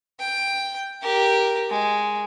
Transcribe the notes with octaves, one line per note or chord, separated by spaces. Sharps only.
G5
G4 A#4
G#3